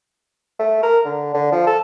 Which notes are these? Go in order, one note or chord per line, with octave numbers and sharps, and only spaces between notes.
A3
A#4
D3
D3
F3
A4